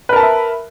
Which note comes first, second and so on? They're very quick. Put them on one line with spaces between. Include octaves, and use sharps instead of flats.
B4 A#4 A5 B5 E5